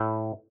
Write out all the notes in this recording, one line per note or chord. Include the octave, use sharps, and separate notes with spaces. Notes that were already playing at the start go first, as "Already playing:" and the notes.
Already playing: A2